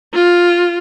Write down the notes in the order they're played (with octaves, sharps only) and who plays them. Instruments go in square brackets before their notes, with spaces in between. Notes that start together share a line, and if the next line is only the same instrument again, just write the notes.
[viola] F4